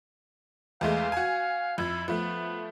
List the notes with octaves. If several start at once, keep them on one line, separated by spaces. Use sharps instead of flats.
E2 G#3 A3 F5
F#4 G#5
F2 E4
F3 A3 B3